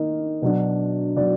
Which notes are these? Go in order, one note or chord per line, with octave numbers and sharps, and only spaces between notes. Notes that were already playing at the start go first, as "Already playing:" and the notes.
Already playing: D#3 A#3 D#4
B2 F#3 D4
B2 F#3 D4 D5